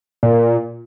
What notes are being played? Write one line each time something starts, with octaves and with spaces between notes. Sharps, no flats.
A#2